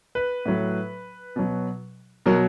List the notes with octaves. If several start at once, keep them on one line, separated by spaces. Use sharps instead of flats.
B4
A2 F#3
B2 F#3
B2 F#3 A#4